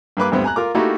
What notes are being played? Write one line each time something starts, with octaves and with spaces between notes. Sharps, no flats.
G2 A#3 B4 D6
D2 G2 B3 C4
G#5 A#5 F#6
F4 A#4 D6
A3 A#3 D#4 E4 F#4 G4